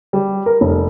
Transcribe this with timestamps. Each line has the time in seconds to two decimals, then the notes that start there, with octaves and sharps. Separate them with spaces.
0.13 G3
0.46 A#4
0.61 F1